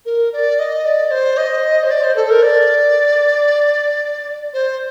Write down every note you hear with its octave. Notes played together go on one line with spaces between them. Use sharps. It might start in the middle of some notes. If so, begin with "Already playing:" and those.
A#4
D5
D#5
D5
C5
D#5
C5
D5
C5
A4
A#4
D5
C5